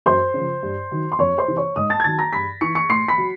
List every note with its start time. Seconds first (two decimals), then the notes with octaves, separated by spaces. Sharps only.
0.06 F#2 C5 C6
0.34 C#3 F3
0.63 G2
0.91 D#3 F#3
1.12 C6
1.19 F2 C#5 C#6
1.38 C5 C6
1.47 C3 E3
1.57 C#5 C#6
1.76 G#2 D#5 D#6
1.90 A5 A6
2.00 G#6
2.04 D#3 F#3 A5 A6
2.18 A#5 A#6
2.33 G2 B5 B6
2.61 E3 C#6 C#7
2.75 C#6 C#7
2.89 A2 C6 C7
3.08 B5 B6
3.18 F#3